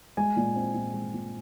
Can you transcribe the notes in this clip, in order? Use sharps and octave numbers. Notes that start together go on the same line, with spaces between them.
G#3 G#5
A#2
C4
A#2
G#3
A#2